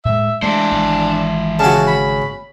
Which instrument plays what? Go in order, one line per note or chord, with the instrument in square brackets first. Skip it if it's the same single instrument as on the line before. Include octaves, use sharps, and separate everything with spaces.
[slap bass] A2 G#3 [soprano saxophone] E5
[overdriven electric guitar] E3 C5 [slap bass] G#3 A3 [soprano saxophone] D4
[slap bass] G#1 G#3
[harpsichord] C#3 F#4 [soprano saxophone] A5
[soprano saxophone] B5